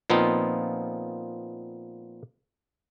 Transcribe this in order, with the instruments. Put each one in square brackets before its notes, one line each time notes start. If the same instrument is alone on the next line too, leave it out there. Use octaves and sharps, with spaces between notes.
[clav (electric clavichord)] A#2 F3 B3 C4 D#4 F4